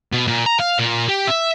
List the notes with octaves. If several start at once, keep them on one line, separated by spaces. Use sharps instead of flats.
B2
A#2
A#5
F5
A#2
G4
E5